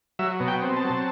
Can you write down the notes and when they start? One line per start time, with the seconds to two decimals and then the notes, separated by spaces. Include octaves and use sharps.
0.19 F#3 E5
0.40 B2
0.48 G5
0.62 C4
0.77 A5
0.84 F#3